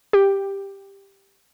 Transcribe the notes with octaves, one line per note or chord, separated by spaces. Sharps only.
G4